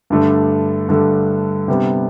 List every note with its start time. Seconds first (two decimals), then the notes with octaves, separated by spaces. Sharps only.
0.10 G2 D3 A3
0.89 G2 D3 A3
1.68 C3 G3 B3 D4